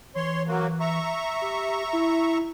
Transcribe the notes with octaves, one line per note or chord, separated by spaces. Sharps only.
E3 C#5 C6
F#3 A#3 F#4
E5 A#5 C#6
G4
E4